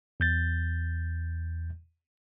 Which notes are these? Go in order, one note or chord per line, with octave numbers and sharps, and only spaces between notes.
E2 G6 A6